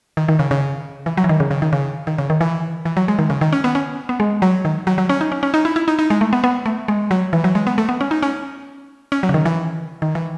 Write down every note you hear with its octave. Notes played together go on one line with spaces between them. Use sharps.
D#3
D#3
C#3
C#3
E3
F#3
E3
D#3
C#3
C#3
D#3
C#3
D#3
C#3
D#3
E3
E3
F#3
G#3
D#3
C#3
D#3
C#4
B3
C#4
B3
G#3
F#3
D#3
F#3
F#3
C#4
D#4
C#4
C#4
D#4
E4
E4
D#4
D#4
G#3
A3
B3
B3
A3
G#3
F#3
E3
F#3
G#3
B3
A3
B3
C#4
D#4
C#4
C#4
F#3
C#3
D#3
E3
D#3
E3